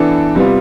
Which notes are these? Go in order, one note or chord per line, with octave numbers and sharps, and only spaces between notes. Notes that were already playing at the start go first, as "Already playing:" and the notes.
Already playing: E3 B3 D4 A4
C3 G3 B3 F4